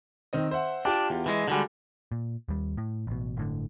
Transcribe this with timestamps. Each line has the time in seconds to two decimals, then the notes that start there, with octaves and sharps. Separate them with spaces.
0.33 D#3 C4 D#5
0.51 C5 E5 F#5
0.85 D4 F4 G4 G5
1.10 E2
1.26 E3 G#3
1.48 D3 G3 G#3 F#4 G#5
2.12 A#2
2.49 D#2 G3
2.77 A2
3.07 A1 B2
3.37 G1 A2 D3